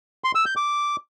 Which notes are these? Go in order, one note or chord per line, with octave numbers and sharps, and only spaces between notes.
C6
E6
G6
D6